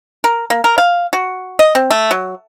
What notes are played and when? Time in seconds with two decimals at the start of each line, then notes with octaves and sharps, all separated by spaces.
0.24 A#4
0.50 A#3
0.64 A#4
0.78 F5
1.13 F#4
1.59 D#5
1.75 C4
1.91 A3
2.11 F#3